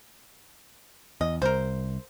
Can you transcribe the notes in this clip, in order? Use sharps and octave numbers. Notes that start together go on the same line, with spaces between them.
E2 D#5
C2 A#4 C5